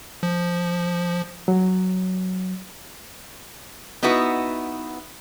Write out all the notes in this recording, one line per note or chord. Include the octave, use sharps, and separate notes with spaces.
F3
F#3
B3 D#4 E4 F#4 B4